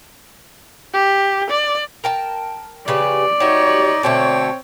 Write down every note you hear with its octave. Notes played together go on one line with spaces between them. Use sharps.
G4
D5
A#4 G5 A5
C#3 G4 B4 D5
D#4 F#4 G4 C#5
B2 D3 A3 C4 C#5